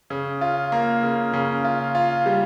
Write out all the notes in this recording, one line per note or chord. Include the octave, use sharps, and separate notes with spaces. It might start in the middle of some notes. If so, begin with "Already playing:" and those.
C#3
F4
A#3
C#3
C#3
F4
F4
G3